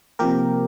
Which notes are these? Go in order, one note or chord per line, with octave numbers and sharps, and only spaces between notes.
C3 F3 A#3 G4 A#4